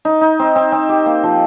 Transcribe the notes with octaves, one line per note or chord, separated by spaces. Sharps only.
D#4
D#4
C4
C4
C4
G4
A#3
F3